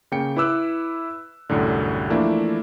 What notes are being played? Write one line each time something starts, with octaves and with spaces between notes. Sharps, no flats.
C#3 A#3 G5 C#7
E4 B4 D6 E6 F#6
C2 F#2 A2 D3
E3 F3 A3 A#3 D4 E4